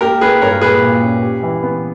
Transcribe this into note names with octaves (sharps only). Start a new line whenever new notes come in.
A#3 G4 A#4
A#3 G#4 B4
G2 A#4 C#5
A#2 G#4 B4
A#2
C#4
G4
E3
B3